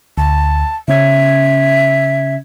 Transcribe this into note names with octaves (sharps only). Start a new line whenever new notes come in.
D2 A5
C#3 C#4 E5 G#6